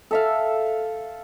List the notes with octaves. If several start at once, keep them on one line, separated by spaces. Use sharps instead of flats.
A4 E5 F5